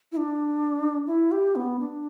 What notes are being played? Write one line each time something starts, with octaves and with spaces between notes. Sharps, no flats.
E4
D4
E4
G4
B3
D4